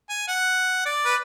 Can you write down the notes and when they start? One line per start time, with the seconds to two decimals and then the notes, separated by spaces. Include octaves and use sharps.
0.09 G#5
0.28 F#5
0.86 D5
1.05 B4